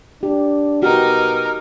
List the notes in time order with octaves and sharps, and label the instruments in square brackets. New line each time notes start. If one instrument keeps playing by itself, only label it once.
[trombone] D4 [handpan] G4
[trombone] B2 [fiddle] D#4 A#4 [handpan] F#4 G4 [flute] F6